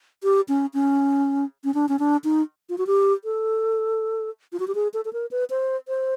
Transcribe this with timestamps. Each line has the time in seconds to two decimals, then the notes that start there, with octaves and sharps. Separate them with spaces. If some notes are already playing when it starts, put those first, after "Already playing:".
0.23 G4
0.48 C#4
0.74 C#4
1.64 C#4
1.74 D4
1.89 C#4
1.99 D4
2.24 D#4
2.69 F4
2.78 F#4
2.87 G4
3.24 A4
4.53 F4
4.60 F#4
4.68 G4
4.75 G#4
4.94 A4
5.05 A4
5.13 A#4
5.31 B4
5.50 C5
5.88 C5